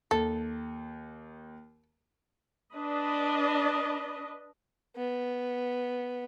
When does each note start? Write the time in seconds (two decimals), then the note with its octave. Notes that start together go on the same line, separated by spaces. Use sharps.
0.11 D#2 A4
2.73 D4 B4 D#5
4.96 B3